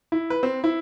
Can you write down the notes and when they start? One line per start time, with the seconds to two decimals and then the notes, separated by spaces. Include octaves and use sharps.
0.12 E4
0.30 B4
0.43 C4
0.64 E4